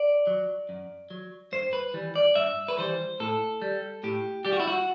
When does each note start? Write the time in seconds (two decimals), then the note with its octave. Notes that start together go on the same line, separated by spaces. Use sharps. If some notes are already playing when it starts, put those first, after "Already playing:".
Already playing: D5
0.27 F#3
0.69 F#2
1.10 F#3
1.52 G2 C5
1.73 B4
1.94 E3 G3
2.16 D5
2.35 G2 E5
2.68 B4
2.78 E3 G3 C5
3.20 A2 A4
3.62 G3
4.03 A2 G4
4.45 G3 G4
4.53 F#4
4.60 E4
4.67 F#4